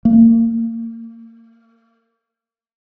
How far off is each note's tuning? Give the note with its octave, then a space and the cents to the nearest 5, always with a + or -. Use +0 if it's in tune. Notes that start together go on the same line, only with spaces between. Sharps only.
A#3 -35